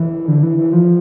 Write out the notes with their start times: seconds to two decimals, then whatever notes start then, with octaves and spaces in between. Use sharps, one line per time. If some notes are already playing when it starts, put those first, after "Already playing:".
Already playing: E3
0.28 D3
0.43 E3
0.58 E3
0.73 F3